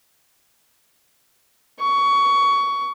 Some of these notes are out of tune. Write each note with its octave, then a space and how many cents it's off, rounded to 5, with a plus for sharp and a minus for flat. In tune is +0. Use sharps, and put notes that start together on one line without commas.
C#6 +20